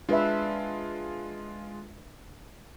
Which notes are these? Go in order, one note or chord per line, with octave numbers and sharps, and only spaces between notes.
G#3 D4 F4 B4 E5